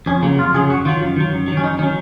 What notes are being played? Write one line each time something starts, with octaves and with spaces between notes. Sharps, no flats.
F2 C#4
C#3 F#3 A#3
F2 F4
C#3 F#3 G#4
F#2 F#4
D#3 F#3 F4
F#2
D#3 F#3
F#2
D#3 F#3
C#4
F#2 D#4
D#3 F#3 C#4